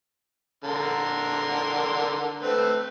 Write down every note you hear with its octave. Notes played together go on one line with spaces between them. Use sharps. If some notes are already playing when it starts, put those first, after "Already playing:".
D3 A#4 C6
A3 C4 B4